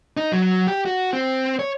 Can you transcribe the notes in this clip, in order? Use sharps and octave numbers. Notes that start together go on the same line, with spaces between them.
D#4
F#3
G4
F#4
C4
C#5